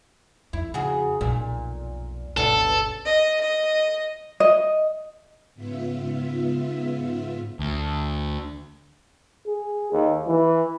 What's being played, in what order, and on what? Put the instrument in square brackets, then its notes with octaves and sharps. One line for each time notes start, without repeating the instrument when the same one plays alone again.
[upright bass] F2 [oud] E4
[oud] C#3 F#4 G#4
[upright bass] B1 F2 [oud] A#2
[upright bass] G1 C#2 [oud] F#2 B2 D4 [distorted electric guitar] A4
[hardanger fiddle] D#5
D#5
[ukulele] D#5
[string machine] G#2 C#3 B3 F4 E5
[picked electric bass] D2
[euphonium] G#4
D#2
E3